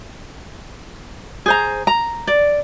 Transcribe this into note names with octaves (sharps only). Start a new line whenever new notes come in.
G#4 C5 A#5
A#5
D5